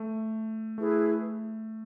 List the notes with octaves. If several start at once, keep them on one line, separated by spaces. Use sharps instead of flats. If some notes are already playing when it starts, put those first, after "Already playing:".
Already playing: A3
A3 E4 G#4 B4